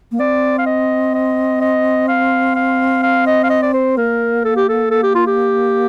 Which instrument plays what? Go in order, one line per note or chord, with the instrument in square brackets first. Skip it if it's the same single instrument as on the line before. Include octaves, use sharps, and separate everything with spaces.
[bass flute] A#3
[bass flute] C4 [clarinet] D5
[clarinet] F5
D#5
D#5
D#5
F5
F5
F5
D#5
F5
D#5
D5
C5
[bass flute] A#3 [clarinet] A#4
[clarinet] A4
G4
A4
A4
G4
F4
G4